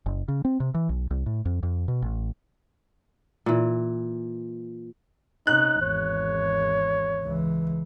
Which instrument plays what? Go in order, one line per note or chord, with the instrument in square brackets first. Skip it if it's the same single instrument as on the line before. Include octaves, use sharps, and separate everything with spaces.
[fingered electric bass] F#1
C#3
C4
C3
E3
B1
C2
A2
F2
F2
B2
A1
[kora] A#2 E3
[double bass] C3 C#4 [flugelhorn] D#4 [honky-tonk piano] F#6
[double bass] G#1 E2 [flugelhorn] C#5
[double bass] C#2 E3